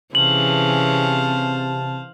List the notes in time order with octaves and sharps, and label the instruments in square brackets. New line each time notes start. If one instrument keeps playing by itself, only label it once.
[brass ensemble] C3 A5 [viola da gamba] E3 C#4 G#4 [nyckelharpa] C5 F5 [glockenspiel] F#7